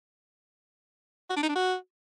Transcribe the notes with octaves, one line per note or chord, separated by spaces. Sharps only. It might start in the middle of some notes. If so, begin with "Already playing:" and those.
F#4
D4
D#4
D4
F#4